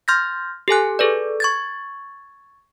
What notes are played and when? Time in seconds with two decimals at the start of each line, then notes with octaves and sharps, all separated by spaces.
0.08 C6 F6 G6 A6 A#6
0.68 G4 A4 G#5 F#6
0.99 G#4 A4 B4 D5
1.40 C#6 G#6 A6